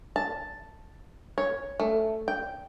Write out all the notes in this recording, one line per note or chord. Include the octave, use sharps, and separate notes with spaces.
A5
C#5
A3
G5